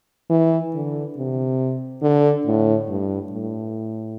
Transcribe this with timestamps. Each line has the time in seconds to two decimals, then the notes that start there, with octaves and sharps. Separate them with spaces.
0.30 E3
0.74 D3
1.16 C3
2.02 D3
2.46 A2
2.89 G2
3.32 A2